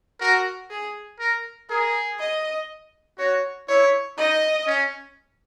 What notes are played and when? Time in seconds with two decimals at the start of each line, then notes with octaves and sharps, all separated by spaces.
0.20 F#4 A#4
0.70 G#4
1.20 A#4
1.70 G#4 A#4
2.19 D#5
3.18 F#4 C#5
3.68 E4 C#5
4.18 D#4 D#5
4.67 C#4